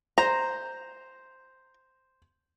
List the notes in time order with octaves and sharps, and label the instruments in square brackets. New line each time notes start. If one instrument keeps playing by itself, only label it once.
[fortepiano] C5 [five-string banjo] A#5